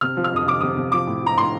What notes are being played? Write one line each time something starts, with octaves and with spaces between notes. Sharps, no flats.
C3 F6
F3
F6
F2 D#6
C3 D6
C3 D#6
C3
F3 D6
A2
F3 A#5
A2 C6